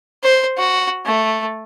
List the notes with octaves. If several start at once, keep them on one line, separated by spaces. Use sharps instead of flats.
C5
F#4
A3